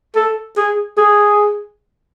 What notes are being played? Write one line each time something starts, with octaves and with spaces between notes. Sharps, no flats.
A4
G#4
G#4